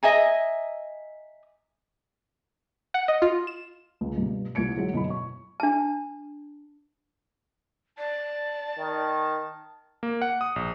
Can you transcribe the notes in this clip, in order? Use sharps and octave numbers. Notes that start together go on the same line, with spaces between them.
D#5 E5 G#5 A#5
F#5
D#5
F4
E7
C#2
G2 B2
C2 F4 G#6 C#7 D7
F#3 G#3 E4 F#4
F#2 B2 E4 B5
C#6
D4 A5
D5 A5
D#3
A#3
F#5
D#6
A#1